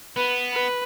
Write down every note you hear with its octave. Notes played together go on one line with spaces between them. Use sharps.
B3 B4
B4